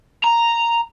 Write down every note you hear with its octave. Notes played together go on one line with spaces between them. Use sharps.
A#5